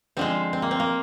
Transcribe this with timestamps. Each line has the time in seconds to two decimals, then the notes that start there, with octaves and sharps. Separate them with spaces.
0.17 D3 F3 G#3 C4
0.53 C4
0.62 A#3
0.71 C4
0.80 A#3